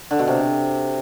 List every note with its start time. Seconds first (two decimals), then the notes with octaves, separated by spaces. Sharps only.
0.11 D3
0.19 B2
0.27 C3